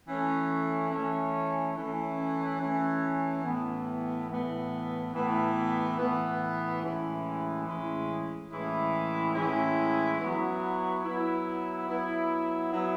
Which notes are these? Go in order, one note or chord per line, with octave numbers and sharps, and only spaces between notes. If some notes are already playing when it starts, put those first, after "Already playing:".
E3 A3 C#4
E3 A3 C#4
E3 A3 C#4
E3 A3 C#4
A2 E3 B3
A2 E3 B3
A2 E3 B3
A2 E3 B3
A2 E3 G#3 C#4 E4
A2 E3 G#3 C#4 E4
A2 E3 G#3 C#4 E4
A2 E3 G#3 C#4 E4
F#3 B3 E4
F#3 B3 E4
F#3 B3 E4
F#3 B3 E4